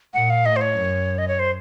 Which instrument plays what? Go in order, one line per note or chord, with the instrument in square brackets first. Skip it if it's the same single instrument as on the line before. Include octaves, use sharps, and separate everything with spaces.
[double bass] A#2 [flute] F#5
[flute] F5
[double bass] A2 [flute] D#5
[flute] C5
C#5
[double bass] F#2
[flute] D#5
C#5
C5